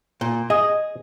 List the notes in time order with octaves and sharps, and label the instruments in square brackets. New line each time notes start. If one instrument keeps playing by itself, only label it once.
[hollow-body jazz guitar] A#2
[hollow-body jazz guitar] G#4 [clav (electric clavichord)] D#5